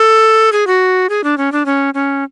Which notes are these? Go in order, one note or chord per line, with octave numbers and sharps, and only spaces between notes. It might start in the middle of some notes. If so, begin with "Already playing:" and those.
Already playing: A4
G#4
F#4
G#4
D4
C#4
D4
C#4
C#4